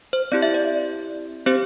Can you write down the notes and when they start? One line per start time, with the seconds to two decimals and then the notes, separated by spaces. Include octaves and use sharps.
0.13 C5
0.32 C4 E4 G4 D5
0.42 E5
0.54 D5
1.46 C4 G4 C5